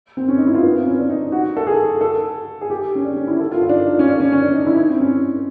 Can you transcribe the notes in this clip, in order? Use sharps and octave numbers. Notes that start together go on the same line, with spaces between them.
C4
C#4
D#4
E4
F4
B3
C4
C#4
D4
D#4
F#4
A4
G#4
A4
G#4
G4
C#4
D4
C#4
E4
A4
F4
F4
D4
D#4
C#4
D4
C#4
C#4
D4
D#4
E4
D4
C4
C#4